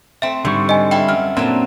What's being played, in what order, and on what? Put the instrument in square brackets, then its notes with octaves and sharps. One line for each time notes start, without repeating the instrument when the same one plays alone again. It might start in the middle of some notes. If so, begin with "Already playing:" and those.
[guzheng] A3 C4 [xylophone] E5
[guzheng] G#2 [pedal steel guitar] D3 G3 C#6
[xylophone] D#5 G#5
[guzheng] E4 A4 F5 [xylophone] G5
[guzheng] F#2 [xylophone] F6
[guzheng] A#2 F#3 A5 [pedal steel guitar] A#3 C4 D4